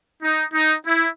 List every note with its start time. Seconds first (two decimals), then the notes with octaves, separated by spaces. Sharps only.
0.23 D#4
0.54 D#4
0.86 E4